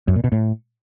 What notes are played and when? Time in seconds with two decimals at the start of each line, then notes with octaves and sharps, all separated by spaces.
0.08 F#2
0.16 A#2
0.24 B2
0.32 A2